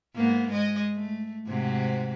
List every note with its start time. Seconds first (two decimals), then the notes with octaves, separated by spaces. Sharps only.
0.15 G#2 A#3 B3
0.51 G#3 D#5
0.94 A3
1.47 G#2 C3 F#4